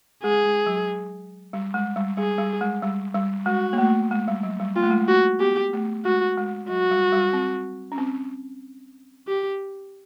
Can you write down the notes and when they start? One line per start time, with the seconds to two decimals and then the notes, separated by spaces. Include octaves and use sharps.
0.23 G#3 G#4
0.45 G#3
0.66 F#3
1.53 G3
1.74 G#3
1.96 G3
2.17 G3 G#4
2.38 G3
2.61 G#3
2.82 G3
3.15 G3
3.46 G#3 F#4
3.73 A#3
3.78 A3
4.11 G#3
4.28 G3
4.43 F#3
4.60 G3
4.76 A#3 F4
4.83 A3
4.91 G#3
4.98 A3
5.08 A#3 F#4
5.40 B3 G4
5.73 A3
6.05 G#3 F#4
6.38 G#3
6.69 F#3 F#4
6.91 G3
7.13 G3
7.33 C4
7.92 C#4
7.98 C4
9.27 G4